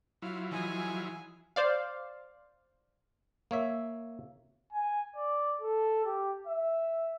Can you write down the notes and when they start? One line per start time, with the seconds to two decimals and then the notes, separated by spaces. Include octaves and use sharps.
0.22 F#3 E4 F4 F5
0.51 E3 F3 D#4 G#4 G#5
1.56 C5 D5 F5
3.51 A#3 C#5 E5
4.73 G#5
5.16 D5
5.62 A4
6.05 G4
6.47 E5